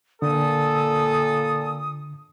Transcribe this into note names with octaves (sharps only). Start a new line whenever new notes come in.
A#2 D3 A4 D#6